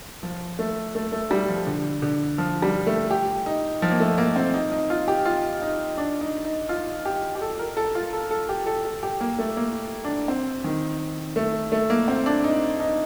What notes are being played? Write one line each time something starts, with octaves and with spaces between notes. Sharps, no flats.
F3
A3
A3
A3
G3
F3
D3
D3
F3
G3
A3
G4
D#4
F3
A#3
A3
A#3
C4
D#4
D#4
F4
G4
F4
D#4
D4
D#4
D#4
F4
G4
G4
A4
A#4
A4
F4
A4
A4
G4
A4
A4
G4
A#3
A3
A#3
D4
C4
D#3
A3
A3
A#3
C4
D4
D#4
D#4